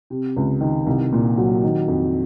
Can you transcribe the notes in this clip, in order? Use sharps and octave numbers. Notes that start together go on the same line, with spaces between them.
C3
C#2
D#3
C2
A#2
F#3
D#3
F2